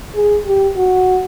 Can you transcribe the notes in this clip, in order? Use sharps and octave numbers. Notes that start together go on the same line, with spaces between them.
G#4
G4
F#4